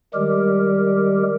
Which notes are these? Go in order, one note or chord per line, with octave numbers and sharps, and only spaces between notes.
D#3 G3 G#3 G4 A#4